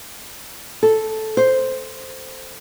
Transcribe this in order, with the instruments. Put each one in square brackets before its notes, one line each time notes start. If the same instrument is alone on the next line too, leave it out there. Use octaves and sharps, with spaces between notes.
[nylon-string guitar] A4
C5